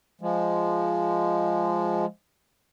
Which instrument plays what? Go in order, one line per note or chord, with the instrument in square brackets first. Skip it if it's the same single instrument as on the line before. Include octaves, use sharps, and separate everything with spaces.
[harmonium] F3 G#3